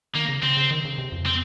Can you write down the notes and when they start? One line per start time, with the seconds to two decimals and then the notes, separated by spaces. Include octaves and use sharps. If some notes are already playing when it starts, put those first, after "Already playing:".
0.15 D#3 A#3
0.29 C#3
0.43 C#3 C4
0.57 C#3
0.71 D#3
0.85 C#3
0.98 C3
1.12 F2
1.26 C4